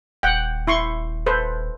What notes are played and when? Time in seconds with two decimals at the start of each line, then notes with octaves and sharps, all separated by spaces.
0.23 D#1 F#5 G5
0.67 E4 C6 C#6
1.26 A4 B4 C5